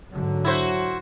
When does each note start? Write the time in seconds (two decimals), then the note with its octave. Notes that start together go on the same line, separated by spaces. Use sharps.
0.13 G#2 D3 F#3
0.45 E4 F#4 C5